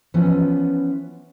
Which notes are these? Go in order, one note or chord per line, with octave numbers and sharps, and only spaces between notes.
E3 F3 B3 C#4